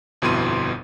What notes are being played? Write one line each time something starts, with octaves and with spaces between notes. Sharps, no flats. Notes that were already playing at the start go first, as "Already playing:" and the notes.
G1 F2 B2 E4 C6 D#7